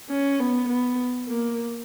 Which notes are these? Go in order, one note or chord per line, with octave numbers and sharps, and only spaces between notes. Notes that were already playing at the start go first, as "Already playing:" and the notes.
C#4
B3
B3
A#3